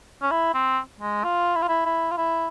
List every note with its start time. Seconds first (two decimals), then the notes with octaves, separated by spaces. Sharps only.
0.22 C#4
0.31 E4
0.54 C4
1.00 G#3
1.24 F4
1.55 E4
1.62 F4
1.68 E4
1.86 E4
2.11 F4
2.17 E4